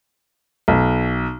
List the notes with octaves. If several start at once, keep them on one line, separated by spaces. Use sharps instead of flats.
B1